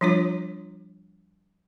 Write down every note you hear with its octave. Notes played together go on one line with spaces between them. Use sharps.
F3 G3 D4 F4 C#5